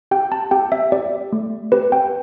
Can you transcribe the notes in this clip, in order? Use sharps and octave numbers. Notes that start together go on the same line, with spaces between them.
G4 G5
A5
G4 G5
E5
G4 D5
A3
G4 B4
G5